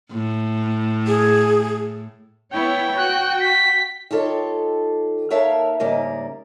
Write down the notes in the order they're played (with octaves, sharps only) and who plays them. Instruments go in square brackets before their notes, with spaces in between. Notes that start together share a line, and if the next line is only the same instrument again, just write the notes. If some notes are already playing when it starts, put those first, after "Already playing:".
[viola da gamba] A2
[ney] G#4
[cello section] B3 E4 C#5 [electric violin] G5
[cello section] F#4 [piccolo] F#6
[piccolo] B6
[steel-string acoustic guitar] D#3 F4 G4 A4 C#5
D#2 A#4 C#5 E5 F5 A5
G#2 C#3 G3 A#3 D#5